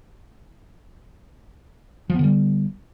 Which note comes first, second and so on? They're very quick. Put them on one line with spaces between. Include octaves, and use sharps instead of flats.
F3 B3 D3 G3